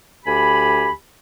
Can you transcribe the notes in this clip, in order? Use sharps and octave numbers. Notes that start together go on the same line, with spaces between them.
D2 G4 G#5 B5